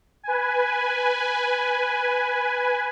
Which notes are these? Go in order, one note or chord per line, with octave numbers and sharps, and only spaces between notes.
B4 G#5